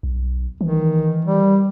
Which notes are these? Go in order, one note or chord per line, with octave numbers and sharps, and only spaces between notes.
B1
D#3 E3
G3